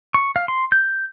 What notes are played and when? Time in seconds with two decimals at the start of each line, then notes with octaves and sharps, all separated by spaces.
0.14 C#6
0.36 F5
0.48 C6
0.72 G6